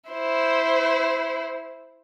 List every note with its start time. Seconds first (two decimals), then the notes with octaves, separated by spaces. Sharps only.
0.10 E4 C5